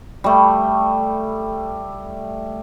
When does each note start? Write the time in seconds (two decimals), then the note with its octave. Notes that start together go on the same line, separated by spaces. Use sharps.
0.24 G3 A3